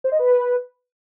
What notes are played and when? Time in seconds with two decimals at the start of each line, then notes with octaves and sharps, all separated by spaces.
0.04 C5
0.12 D#5
0.19 B4